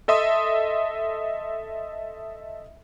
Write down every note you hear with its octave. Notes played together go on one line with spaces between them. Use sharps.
A4 D#5 E5 C6 D#6